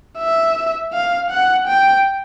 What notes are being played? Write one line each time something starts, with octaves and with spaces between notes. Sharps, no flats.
E5
F5
F#5
G5